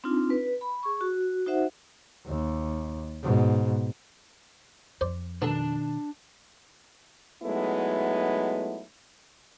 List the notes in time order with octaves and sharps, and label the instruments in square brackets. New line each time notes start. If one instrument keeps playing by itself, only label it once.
[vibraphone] C4 D4 D#4 F4
B4
B5
G#4 C#6
F#4
D#4 F#4 C5 E5 F#5
[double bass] D#2
G#2 B2
[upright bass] F2 [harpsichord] C5 D5
[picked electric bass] B2 D#3 [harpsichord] B3 A4 [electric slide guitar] D4 A5
[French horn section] F#3 G#3 A3 B3 D#4 E4